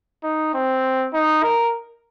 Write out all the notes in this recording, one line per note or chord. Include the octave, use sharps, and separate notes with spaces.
D#4
C4
D#4
A#4